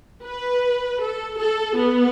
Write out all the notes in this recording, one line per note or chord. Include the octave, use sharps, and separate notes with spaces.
B4
A4
A4
B3